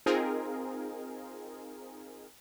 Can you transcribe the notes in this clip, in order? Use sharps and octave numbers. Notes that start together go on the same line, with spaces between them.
C4 D#4 F4 G#4 A#4